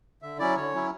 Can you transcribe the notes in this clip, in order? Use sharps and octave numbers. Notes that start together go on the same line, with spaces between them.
D3 E5
F#3 C#4 E4 D5
D3 C#5
F#3 C#4 E4